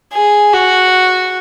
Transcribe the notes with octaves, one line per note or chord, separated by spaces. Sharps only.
G#4
F#4